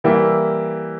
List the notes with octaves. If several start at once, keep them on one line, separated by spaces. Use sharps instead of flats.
E3 G3 A#3 E4 G4